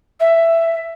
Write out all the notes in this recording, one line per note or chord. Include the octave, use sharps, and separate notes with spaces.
E5